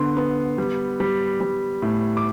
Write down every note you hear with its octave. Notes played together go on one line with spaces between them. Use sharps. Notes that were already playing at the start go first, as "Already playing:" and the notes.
Already playing: D3 B3 C6
B3
G3
G3
G3
A2
D6